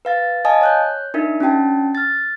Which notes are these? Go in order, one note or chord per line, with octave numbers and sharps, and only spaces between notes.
B4 F5 A6
D#5 F5 G#5 A5 D#6
C#5 F#6 G6
D4 D#4 A#4 E5
C#4 D4 F#4 G5 A5
F6 A6